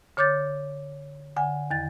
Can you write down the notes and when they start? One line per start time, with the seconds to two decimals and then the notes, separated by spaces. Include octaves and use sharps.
0.17 D3 C#5 D6 G6 A6
1.37 D3 F#5 G#5
1.71 E2 D#3 A6